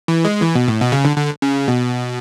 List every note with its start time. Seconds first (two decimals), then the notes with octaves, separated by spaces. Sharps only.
0.08 E3
0.25 G#3
0.42 E3
0.55 B2
0.68 A2
0.80 B2
0.92 C#3
1.05 D3
1.17 D3
1.42 C#3
1.68 B2